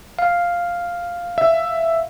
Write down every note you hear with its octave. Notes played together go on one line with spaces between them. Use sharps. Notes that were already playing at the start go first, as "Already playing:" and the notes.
F5
E5